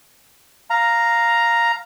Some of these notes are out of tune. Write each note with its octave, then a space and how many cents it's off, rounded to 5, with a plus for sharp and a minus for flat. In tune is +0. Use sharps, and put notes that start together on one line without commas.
F5 +0 A#5 +0